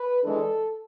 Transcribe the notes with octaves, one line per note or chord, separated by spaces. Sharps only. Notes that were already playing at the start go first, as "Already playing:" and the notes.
Already playing: B4
E3 G#3 D4 A4